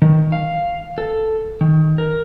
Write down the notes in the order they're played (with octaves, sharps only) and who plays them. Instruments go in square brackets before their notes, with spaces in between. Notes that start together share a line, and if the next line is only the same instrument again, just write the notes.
[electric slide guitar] D#3
F5
A4
D#3
A#4